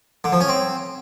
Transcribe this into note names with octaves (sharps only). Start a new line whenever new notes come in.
D3
F3
C#4
C4